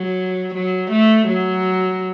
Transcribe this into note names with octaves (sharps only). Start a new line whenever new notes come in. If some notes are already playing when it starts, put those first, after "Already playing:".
Already playing: F#3
F#3
A3
F#3